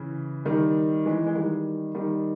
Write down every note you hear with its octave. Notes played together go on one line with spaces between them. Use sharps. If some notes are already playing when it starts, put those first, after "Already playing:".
Already playing: C#3 E3
D#3 G3
E3 G#3
G#3
D#3 G3
D#3 G3